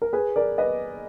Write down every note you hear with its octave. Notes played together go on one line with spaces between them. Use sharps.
A#4
G#4 B4
A#4 D5
B4 D#5